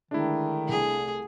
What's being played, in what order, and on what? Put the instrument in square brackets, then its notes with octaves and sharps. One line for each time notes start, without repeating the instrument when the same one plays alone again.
[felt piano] D3 G#3 A3 [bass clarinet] D#3 [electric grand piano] D4 E4
[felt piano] C2 A3 [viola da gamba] G#4